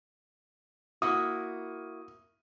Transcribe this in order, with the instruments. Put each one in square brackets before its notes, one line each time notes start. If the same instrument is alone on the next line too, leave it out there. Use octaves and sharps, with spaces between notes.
[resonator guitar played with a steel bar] A#3 E4 F#4 [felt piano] D#6